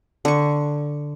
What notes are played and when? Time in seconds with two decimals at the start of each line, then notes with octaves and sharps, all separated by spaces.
0.25 D3 C#6